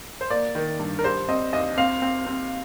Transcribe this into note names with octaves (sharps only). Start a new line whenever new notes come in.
C5
A#3 D5
D#3
G2
A#4
G3 C5
C4 D#5
D#2 D#5
C4 F5
C4
C4